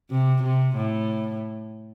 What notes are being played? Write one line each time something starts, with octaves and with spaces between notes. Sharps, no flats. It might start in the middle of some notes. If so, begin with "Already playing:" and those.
C3
C3
A2